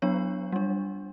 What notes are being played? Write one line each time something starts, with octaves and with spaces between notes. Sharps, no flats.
F#3 B3 D4 C#5
G3 D4